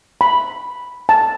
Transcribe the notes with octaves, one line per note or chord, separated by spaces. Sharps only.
B5
A5